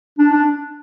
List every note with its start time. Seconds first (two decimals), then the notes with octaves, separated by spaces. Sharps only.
0.19 D4
0.32 D4